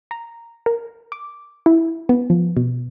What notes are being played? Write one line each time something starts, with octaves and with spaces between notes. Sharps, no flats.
A#5
A#4
D6
E4
B3
F3
B2